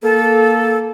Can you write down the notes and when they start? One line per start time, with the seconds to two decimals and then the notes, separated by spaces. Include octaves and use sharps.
0.03 A#3 A4